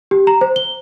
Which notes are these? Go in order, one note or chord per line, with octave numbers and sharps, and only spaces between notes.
G4
A#5
C5
G7